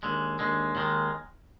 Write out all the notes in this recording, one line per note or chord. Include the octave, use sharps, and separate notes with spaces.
D#2 D3 G#3
D#2 D3 G#3
D#2 D#3 G#3